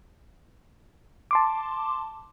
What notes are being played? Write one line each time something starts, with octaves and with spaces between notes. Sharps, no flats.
A5 C6 D6